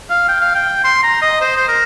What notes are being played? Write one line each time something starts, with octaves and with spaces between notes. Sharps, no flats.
F5
G5
F5
G5
C6
A#5
D#5
C5
C5
A#4